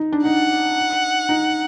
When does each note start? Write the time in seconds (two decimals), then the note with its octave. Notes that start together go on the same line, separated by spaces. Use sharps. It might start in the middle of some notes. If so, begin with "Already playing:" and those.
Already playing: D#4
0.12 D4
0.25 D#4 F#5
1.29 D#4